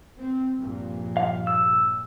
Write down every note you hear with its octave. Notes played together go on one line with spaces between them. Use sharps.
C4
A#1 G2 A#2
F5
E6